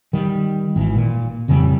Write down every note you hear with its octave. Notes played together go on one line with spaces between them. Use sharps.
D#3 G3
G#1 E3
A#2
F2 C#3 E3 G3